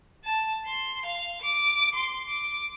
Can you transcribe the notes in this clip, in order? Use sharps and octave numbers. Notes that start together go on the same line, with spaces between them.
A5
C6
F5
D6
C6
D6